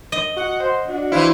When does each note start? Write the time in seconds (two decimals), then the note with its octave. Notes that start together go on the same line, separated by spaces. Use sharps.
0.12 D#5
0.37 F#4 F#5
0.60 C5 F#5
0.87 D4 F#4
1.12 E3 E4 C5 F5